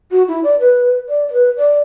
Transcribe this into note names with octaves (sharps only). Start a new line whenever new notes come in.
F#4
E4
D5
B4
D5
D5
B4
D5